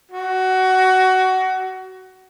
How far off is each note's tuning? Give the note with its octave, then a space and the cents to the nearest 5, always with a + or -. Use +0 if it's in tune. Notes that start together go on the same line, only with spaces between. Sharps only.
F#4 +20